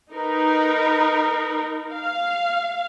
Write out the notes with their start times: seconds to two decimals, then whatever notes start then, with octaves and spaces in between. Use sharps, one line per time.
0.13 D#4 A#4 B4
1.93 F5